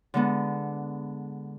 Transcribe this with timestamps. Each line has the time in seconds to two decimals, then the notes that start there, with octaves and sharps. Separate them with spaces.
0.14 D3 G#3 B3